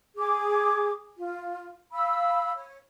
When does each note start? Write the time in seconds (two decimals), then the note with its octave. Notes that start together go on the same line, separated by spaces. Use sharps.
0.17 G#4 D6
1.19 F4
1.93 F5 B5 E6
2.56 C#5